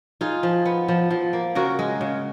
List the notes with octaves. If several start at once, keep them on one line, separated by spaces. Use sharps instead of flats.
D#4 F4 G#4
F3
B3
F3
F3
A#3
C#3 F#4 A#4
G#3
C#3